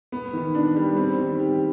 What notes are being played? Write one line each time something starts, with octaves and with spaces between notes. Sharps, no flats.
B3
D#3
D4
G3
C4
D#3
G4